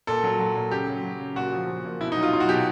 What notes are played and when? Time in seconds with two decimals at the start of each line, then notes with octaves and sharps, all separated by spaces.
0.07 A#2 A4
0.23 F#3
0.39 F#3
0.56 A#2
0.71 C#3 G4
0.88 F#3
1.03 F#3
1.20 C#3
1.36 A#2 F#4
1.53 F3
1.68 F3
1.85 A#2
2.00 B2 E4
2.12 D#4
2.17 F#3
2.23 F4
2.33 F#3 F4
2.40 F#4
2.49 B2 G4